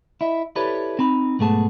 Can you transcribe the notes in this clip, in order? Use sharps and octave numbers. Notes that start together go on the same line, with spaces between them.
E4 D#5 E5
E4 G4 A4 B4 C#5 D5
C4 D#4 B5
B1 G#2 A3 B3 G#4 A5